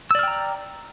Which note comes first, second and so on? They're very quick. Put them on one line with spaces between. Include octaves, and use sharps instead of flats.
E6 D5 F6 G5 A#5